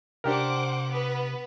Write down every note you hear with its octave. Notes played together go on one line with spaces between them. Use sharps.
C3 D4 G4 A#4 C5 F#5 D6
B3 B4